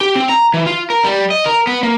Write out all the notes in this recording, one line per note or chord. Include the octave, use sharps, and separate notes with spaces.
G4
C4
A#5
E3
F4
A#4
G3
D#5
A#4
B3
A#3